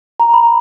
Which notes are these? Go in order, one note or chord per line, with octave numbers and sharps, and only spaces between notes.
A#5
B5